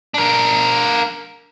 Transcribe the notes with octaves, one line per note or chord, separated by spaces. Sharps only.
D4 A#4